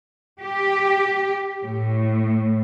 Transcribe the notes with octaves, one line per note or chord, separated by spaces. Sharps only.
G4
A2